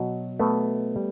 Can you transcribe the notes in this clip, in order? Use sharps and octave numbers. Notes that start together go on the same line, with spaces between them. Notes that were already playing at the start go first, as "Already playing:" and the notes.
Already playing: B2 F#3
A3 B3
G3